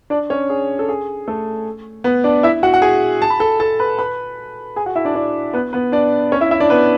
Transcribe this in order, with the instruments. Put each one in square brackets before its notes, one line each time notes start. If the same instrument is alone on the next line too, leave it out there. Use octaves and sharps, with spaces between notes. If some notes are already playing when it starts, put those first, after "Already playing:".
[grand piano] D4 D5
C#4 C#5
G#4
A4
G#4
A3 A4
B3 B4
D4 D5
E4 E5
F#4 F#5
F#5
G#4 G#5
A5
B5
A4 A5
A4 A5
B4 B5
B4 B5
G#4 G#5
F#4 F#5
E4 E5
D4 D5
D4 D5
B3 B4
B3 B4
D4 D5
C#4 C#5
E4 E5
E4 E5
D4 D5
B3 B4